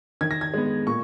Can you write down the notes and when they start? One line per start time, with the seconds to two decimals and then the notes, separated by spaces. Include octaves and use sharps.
0.21 D#3 G#6
0.31 A#6
0.41 G#6
0.53 G#3 B3
0.87 A#2 C#6